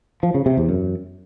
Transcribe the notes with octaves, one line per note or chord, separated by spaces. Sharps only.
F3
C#3
C3
E2
F#2